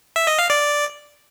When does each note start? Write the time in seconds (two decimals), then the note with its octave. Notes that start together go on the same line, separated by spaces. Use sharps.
0.16 E5
0.27 D#5
0.38 F5
0.50 D5